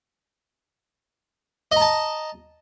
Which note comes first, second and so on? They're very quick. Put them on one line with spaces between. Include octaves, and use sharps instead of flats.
D#5 A#5 A5